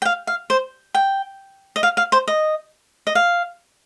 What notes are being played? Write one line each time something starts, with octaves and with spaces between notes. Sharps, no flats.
G5
F5
F5
C5
G5
D#5
F5
F5
C5
D#5
D#5
F5